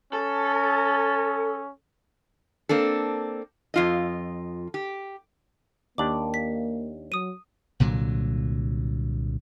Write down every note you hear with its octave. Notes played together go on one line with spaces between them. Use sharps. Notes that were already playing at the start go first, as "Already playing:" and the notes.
C#4 A4
A#3 C4 D4 A4
F2 F4 D#5
G4
D#2 A#3 D4 G4 D6 F#7
B6
F#3 D#6 D#7
C2 A#2 D3 F#3